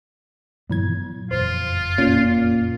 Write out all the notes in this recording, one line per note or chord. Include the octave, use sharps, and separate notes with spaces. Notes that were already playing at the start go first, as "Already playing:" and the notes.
G2 A#2 E3 F#3 B3 G#6
F#1 F2 F4 C5
A#2 C#4